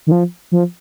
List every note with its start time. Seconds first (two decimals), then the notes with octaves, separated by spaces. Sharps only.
0.07 D#3
0.12 F3
0.52 F3